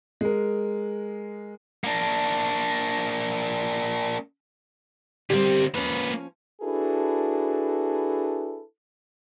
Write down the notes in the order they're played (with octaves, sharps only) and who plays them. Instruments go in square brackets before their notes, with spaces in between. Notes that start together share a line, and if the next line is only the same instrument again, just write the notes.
[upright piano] G#3 A#4
[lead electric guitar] A#3 D4
[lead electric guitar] D3 C4 [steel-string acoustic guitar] G3 A#3 G4
[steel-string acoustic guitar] F3 C#4 [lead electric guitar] A#3 B4
[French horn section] D4 E4 F#4 G#4 A4 B4